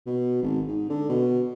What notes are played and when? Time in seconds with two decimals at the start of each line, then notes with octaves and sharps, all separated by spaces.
0.06 B2
0.42 G#1
0.67 G#2
0.89 D3
1.09 B2